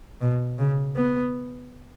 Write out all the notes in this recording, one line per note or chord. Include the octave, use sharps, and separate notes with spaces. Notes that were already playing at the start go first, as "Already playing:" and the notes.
B2
C#3
B3